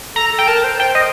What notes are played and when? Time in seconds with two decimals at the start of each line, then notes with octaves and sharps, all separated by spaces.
0.16 A4 A#5
0.32 A4
0.38 G5
0.48 A#4 A5
0.64 C5
0.79 C5 G5
0.95 D#5